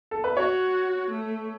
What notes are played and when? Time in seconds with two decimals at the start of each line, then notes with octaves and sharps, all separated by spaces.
0.11 A4
0.24 B4
0.37 F#4 C#5
1.11 A3